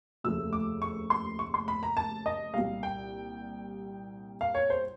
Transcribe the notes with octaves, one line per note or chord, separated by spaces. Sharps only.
F1 D#2 C#3 F3 A3 E6
D6
C#6
C6
C#6
C6
B5
A#5
A5
D#5
C2 A#2 G3 F5
G5
F5
C#5
C5